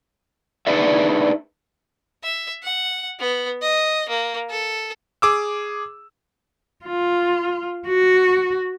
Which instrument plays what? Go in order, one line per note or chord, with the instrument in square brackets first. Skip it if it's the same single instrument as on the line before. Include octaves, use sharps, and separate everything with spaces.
[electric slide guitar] D4 D#4 G#4 B4 D5 E5
[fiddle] E5
F#5
B3
D#5
A#3
A4
[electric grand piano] G#4 D6 E6
[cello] F4
F#4